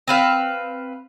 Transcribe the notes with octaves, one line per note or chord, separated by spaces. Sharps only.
C4 B4 F5